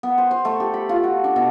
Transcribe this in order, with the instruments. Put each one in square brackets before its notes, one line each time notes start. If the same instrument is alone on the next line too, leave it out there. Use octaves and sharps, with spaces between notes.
[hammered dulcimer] B3
C5
C5
A3
G4
B5
F4
F#4
D4
B2